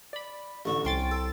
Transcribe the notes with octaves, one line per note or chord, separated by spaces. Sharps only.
D5 B5
A1 D3 C#6
C2 C#4 G5 C6 A6
A4